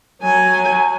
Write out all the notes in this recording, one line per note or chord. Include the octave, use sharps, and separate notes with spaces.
F#3 G#5